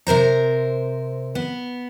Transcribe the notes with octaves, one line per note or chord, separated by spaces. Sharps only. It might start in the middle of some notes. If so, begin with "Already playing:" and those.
C3 A#4 C5 A#5
B3